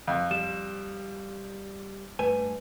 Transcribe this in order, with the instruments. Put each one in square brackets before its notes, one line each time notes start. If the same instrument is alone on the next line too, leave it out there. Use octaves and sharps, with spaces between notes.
[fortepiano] F2
[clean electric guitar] G3 [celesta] E7
[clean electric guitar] G2 A3 G#5 [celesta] B4